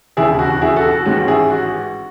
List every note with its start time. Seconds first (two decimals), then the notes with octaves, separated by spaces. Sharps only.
0.17 E1 D#2 C#3 E4 G#4
0.39 F#4
0.50 F#4
0.62 E4 G#4
0.76 F#4 A4
0.91 F#4
1.05 A1 G#2 D#3 G#3 C#4 F#4
1.28 E4 G#4
1.50 F#4